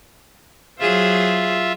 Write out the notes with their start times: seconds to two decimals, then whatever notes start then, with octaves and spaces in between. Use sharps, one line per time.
0.80 F#3 F4 G#4 C5 E5